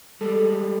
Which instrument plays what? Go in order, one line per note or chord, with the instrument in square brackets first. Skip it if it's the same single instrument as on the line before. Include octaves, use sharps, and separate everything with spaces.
[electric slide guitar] G3 G#3 [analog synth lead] A4